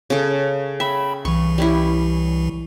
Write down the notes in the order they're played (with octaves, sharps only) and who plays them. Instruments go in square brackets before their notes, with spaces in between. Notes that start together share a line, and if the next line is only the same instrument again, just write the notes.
[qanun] C#3 A4
[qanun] E5 [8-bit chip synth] G5 B5
[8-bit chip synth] C2 E3 [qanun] C#6
[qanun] G3 C#4 E4